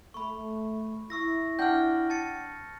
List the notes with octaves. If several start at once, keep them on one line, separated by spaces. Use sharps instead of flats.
A3 B5 C#6
E4 C#6 E6 A#6
D4 F#5 G5 F6 G6
A5 A6 C#7